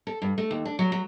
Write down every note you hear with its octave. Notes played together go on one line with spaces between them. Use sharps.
A4
G2
A3
D#2
D4
F#3
F#3